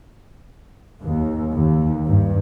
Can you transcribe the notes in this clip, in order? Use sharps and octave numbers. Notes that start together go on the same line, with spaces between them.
D#2
D#2
G2